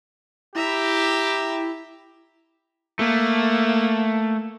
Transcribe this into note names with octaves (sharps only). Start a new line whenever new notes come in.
E4 G4 E5 A#5
A3 A#3